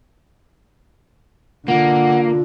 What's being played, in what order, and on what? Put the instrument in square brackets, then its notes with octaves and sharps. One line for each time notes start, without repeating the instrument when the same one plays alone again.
[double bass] D3 [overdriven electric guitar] A#3 [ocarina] F4 [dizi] F#5